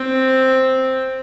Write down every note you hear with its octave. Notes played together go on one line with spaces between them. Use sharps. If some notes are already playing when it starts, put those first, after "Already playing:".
Already playing: C4